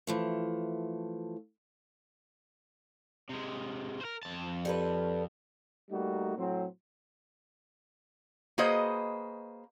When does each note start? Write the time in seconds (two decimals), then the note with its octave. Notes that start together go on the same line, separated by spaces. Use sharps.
0.07 E3 F3 A3
3.30 C3 G#3
4.01 A#4 C5
4.23 F2 A5
4.65 G3 A4 B4
5.91 G3 A3 A#3 D#4 F#4
6.37 A2 F#3 C4
8.58 A#3 F#4 G#4 B4 C5 D#5